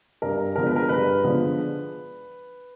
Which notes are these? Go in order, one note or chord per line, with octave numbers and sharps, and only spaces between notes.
G2 A#4
D3 F3 G#3 B3 A#4
B4
A#4
G2 B4
D3 F3 G#3 B3